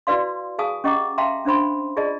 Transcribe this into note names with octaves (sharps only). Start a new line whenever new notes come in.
E4 F#4 B4 D5 F5 C6
G#4 F5 G#5 A5 D#6
C#4 G4 D#5 F#5 A#5 D6
E5 F5 G5 A5 A#5 C6
C#4 D4 C5 B5 C6
F4 G#4 D5 D#5 A5